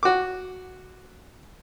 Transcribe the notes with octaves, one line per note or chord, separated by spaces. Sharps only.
F#4 D6